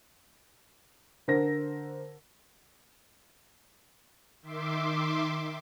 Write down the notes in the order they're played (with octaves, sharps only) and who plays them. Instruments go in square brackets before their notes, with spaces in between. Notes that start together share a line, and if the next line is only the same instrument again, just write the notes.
[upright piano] D3 A#4 C5 A#6
[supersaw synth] D#3 E5 C6 D6